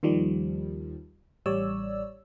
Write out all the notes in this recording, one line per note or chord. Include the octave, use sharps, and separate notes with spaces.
D#2 D#3 F3 G3
A1 G3 C#5 D5 E6